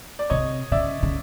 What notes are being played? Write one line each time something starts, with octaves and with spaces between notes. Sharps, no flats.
D5
C3 C#5 D#5
C#3 D5 E5
C#3